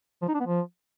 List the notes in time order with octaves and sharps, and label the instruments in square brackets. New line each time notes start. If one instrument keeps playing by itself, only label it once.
[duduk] F3
D#4
D4
B3
F3